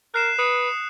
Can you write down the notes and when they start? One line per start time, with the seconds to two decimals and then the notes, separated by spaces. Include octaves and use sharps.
0.14 A#4 F#6 C7 E7
0.39 B4 D#6 C#7